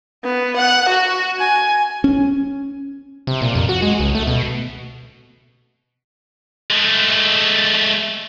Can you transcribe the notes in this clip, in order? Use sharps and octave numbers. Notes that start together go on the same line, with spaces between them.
B3
F#5
F#4
G#5
C#4
C3
A#2
F2
F#4
G#3
C#2
A3
B2
G#3 A3